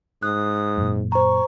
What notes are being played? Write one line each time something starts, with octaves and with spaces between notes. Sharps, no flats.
G#2 D#6 F#6
F#2 A#2
C5 A#5 C#6